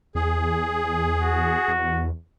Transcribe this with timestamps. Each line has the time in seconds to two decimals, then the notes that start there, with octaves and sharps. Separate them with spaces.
0.15 E2 G#4
1.20 F#4
1.68 E2